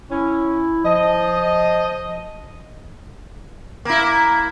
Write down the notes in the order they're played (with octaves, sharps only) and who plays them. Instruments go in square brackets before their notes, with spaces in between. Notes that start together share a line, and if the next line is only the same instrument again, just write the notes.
[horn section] C#4 [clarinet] E4
[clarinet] F3 [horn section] D#5
[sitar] A#3 E4